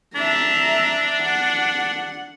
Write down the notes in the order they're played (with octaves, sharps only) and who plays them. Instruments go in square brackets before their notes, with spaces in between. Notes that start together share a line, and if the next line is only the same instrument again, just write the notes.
[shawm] D4 [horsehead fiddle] E5 A#5
[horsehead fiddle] F#5